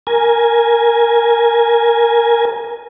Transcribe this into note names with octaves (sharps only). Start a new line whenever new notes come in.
A#4 G#5